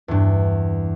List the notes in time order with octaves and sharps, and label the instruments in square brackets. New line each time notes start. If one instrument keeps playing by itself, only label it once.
[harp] E2 G2